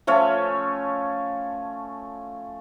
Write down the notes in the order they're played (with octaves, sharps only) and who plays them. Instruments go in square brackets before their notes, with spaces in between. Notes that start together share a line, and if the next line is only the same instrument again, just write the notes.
[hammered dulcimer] F3 A3 C#4 C#5